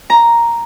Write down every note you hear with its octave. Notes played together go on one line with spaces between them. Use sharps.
A#5